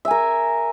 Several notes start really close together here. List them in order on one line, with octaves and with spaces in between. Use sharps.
E5 G#5 A#4